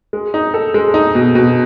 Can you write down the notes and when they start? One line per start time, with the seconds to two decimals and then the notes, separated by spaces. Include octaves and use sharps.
0.13 G#3
0.34 D#4
0.54 A4
0.74 G#3
0.94 D#4
1.15 B2
1.35 B2